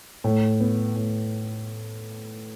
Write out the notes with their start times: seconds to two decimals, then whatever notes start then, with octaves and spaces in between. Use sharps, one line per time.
0.24 A2
0.60 B3
0.96 A2